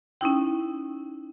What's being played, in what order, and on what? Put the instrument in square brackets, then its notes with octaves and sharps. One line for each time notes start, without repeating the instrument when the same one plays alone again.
[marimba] C#4 D#4 E4 G5